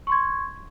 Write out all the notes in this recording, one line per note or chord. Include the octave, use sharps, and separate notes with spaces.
C6 C#6 G#6